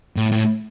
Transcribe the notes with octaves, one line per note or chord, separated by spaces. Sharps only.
A2
A2